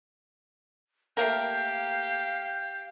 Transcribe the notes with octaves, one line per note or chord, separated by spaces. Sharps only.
A3 A#3 G4 A#4 F5 G6